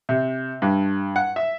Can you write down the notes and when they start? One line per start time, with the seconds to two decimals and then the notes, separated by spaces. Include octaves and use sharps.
0.09 C3
0.62 G2
1.16 F#5
1.36 E5